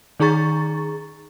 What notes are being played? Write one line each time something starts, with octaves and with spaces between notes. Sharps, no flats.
D#3 D#4 G#4 A#5 C#6 A6